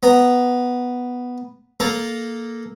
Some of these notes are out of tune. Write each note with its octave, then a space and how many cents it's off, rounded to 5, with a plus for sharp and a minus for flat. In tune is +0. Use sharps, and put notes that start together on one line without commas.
B3 +0 A#5 +0
A#3 +0 A4 -15 A#5 +0